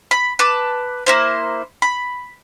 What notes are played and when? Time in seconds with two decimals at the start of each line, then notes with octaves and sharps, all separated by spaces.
0.11 B5
0.39 B4 A5 D6
1.06 A#3 E4 C5
1.82 B5